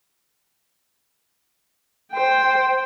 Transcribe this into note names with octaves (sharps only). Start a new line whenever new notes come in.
C5 G5